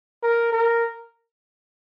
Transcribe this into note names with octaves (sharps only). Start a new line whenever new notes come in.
A#4
A#4